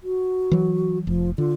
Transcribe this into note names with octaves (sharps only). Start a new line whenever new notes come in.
F#4
E3 F#3
F1 F3
D3 F4